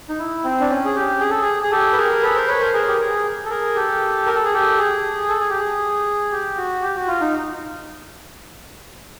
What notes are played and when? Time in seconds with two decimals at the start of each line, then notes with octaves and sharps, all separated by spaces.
0.09 D#4
0.19 E4
0.44 C4
0.60 D4
0.70 C#4
0.85 G#4
0.95 G4
1.20 G#4
1.30 A4
1.41 G#4
1.63 G#4
1.72 G4 A4
1.93 B4
1.97 G#4 A#4
2.22 A4 B4
2.35 A#4 C5
2.48 B4 C#5
2.61 A#4 C5
2.74 G#4 A#4
2.88 G4
3.00 G#4
3.45 A4
3.50 G#4 A#4
3.75 G4 A4
4.26 A#4
4.36 A4
4.44 G#4
4.53 G4 A4
4.78 G#4
5.29 A4
5.40 G#4
5.50 G4
5.58 G#4
6.31 G4
6.57 F#4
6.82 G4
6.95 F#4
7.08 F4
7.21 D#4